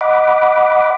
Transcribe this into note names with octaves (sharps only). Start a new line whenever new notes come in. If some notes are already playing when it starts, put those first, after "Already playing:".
D#5 F#5 B5 D6